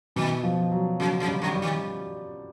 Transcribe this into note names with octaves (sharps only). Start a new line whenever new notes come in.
B2 D#3
F3
F#3
C#3 F#3
C#3 F#3
G3
D3
G3
D#3